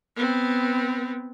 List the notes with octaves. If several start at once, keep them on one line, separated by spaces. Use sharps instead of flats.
B3 C4